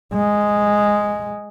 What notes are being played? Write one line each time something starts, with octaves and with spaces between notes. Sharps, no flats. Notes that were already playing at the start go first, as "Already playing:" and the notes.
G#3